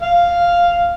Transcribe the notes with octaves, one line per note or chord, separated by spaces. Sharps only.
F5